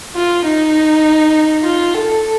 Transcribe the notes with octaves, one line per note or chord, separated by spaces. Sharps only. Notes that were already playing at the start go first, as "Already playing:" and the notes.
F4
D#4
F4
A4